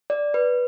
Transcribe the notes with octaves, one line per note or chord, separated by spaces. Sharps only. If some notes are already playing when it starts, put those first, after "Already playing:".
D5
B4